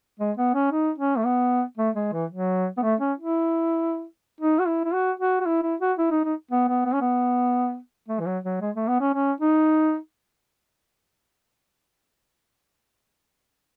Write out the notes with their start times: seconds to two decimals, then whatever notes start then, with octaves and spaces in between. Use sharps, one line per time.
0.19 G#3
0.37 B3
0.54 C#4
0.72 D#4
0.98 C#4
1.17 A3
1.25 B3
1.77 A3
1.95 G#3
2.13 E3
2.30 F#3
2.77 B3
2.82 A3
3.00 C#4
3.18 E4
4.41 D#4
4.59 F#4
4.67 E4
4.84 E4
4.93 F#4
5.20 F#4
5.40 F#4
5.46 E4
5.63 E4
5.80 F#4
5.98 E4
6.11 D#4
6.25 D#4
6.51 B3
6.68 B3
6.85 B3
6.93 C#4
7.01 B3
8.08 A3
8.20 E3
8.26 F#3
8.44 F#3
8.61 G#3
8.75 A3
8.87 B3
9.00 C#4
9.14 C#4
9.41 D#4